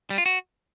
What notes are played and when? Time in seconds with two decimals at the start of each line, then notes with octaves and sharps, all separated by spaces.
0.10 G3
0.18 F4
0.26 F#4